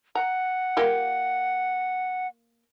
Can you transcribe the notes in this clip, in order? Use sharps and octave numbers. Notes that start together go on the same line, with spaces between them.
F#5 A#5
A#3 F4 G4